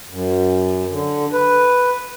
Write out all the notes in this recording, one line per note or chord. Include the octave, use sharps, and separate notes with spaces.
F#2
D3
B4